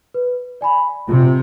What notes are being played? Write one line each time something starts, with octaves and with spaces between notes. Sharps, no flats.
B4
D5 G#5 B5
C3 F4